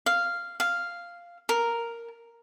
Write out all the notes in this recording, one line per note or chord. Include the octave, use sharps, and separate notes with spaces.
F5
F5
A#4